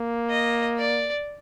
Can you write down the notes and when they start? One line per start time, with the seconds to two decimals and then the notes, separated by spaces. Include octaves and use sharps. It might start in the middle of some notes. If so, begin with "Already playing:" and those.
Already playing: A#3
0.30 D#5
0.78 D5